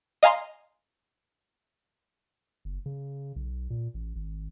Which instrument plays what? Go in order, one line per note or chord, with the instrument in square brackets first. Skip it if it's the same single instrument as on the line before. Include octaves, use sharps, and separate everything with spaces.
[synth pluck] D#5 F5 G#5 A#5 C6
[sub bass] F#1
C#3
B1
A#2
A1
G#1